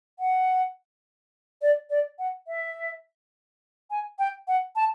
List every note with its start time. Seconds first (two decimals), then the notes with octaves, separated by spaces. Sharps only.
0.19 F#5
1.62 D5
1.90 D5
2.19 F#5
2.47 E5
3.90 G#5
4.19 G5
4.48 F#5
4.76 A5